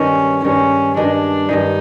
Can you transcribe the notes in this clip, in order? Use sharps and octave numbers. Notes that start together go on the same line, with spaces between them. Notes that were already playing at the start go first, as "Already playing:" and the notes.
Already playing: G2 D#3 G#3 C#4
G2 D#3 G#3 C#4
G2 D#3 G#3 D4
G2 D#3 G#3 D#4